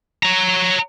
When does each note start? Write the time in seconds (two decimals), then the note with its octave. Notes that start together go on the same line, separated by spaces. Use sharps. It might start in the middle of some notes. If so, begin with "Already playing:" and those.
0.23 C#5 A#5